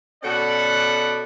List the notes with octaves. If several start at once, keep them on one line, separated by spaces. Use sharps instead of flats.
B2 C#4 F#4 A4 D5 F#5